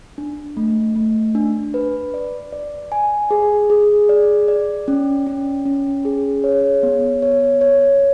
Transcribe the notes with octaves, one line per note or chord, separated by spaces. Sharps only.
D4
A3
A3
D4
B4
D5
D5
G#5
G#4
G#4
D5
D5
C#4
C#4
C#4
G#4
C#5
B3
C#5
C#5